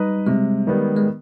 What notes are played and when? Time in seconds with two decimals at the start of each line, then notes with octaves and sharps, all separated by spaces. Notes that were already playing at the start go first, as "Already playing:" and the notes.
Already playing: G3 D#4 B4 D#5
0.27 C3 G#3
0.67 D#3 G3 B3
0.97 G#3